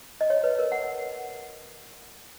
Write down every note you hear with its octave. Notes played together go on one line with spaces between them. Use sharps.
D#5
C#5
B4
A#4
F#5